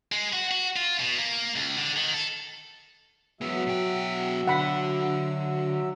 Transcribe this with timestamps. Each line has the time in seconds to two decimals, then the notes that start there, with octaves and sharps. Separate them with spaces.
0.12 G#3
0.33 F#4
0.51 F#4
0.76 F4
1.00 B2
1.19 A#3
1.56 C#2
1.77 D3
1.96 D#3
2.14 A4
3.41 F#3 G#3 B3 F#4 E5
3.66 B2 G5
4.47 D3 F#5 B5